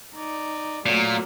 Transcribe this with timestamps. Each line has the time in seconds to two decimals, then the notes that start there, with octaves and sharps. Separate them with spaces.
0.15 D#4 D5
0.86 A#2 F#3 A3 A#3